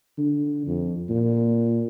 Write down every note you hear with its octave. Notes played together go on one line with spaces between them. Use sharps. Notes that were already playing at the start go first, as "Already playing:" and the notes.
D3
F2
A#2